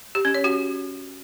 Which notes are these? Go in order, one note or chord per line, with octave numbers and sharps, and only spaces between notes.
G4
C#4
C#5
F#4